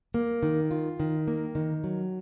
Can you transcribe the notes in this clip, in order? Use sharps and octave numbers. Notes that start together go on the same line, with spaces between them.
A#3
D#3
F4
D#3
A#3
D#3
F#3